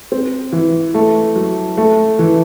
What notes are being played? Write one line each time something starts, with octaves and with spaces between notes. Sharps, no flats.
C4
E3
A3
F#3
A3
E3